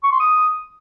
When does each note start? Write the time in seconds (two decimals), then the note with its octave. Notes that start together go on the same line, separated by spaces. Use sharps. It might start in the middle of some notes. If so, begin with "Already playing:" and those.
0.03 C#6
0.12 C6
0.20 D#6